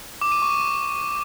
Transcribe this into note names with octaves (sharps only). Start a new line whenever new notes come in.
D6
D#7
C#6